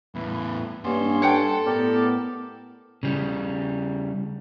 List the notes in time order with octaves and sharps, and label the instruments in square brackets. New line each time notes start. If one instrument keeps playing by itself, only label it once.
[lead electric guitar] E2 A2 [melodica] E4 B4
[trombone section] G2 [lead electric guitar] A#3 F#5 [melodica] C#4 C6
[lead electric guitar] A4 A5 [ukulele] C#5 F#5 G5
[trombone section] A2 B3 [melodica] G4 A#4 D5
[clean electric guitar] C#3 G3